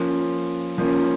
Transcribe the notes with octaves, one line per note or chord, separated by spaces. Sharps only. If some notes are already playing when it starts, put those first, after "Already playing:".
Already playing: F3 A#3 C#4
F3 A#3 C#4